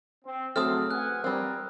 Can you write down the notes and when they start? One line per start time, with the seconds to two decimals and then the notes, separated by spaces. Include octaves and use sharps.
0.25 C4
0.56 C#3 F#3 A3 C4 A4 D#6 F6
0.91 B4 F#5 G#5 F#6
1.24 G3 C4 A#4